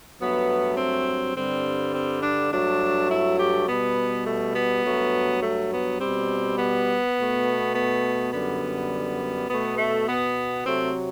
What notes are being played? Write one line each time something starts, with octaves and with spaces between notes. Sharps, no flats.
G2 F#3 A3 B3
C4
G2 D3 G3 C4
C4
D4
G2 F#3 A3 D4
E4
G4
B2 G3 B3
A3
B3
G2 F#3 A3
A3
B3
G3 C4
B2
B3
B2 A3
B3
F#2 D3 G3 B3
B2 A3 B3
A3
B3
C3 F#3 A3 C4